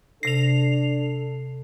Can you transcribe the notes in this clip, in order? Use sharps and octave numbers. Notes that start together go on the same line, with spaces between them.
C3 D4 A4 A#6 C7 F7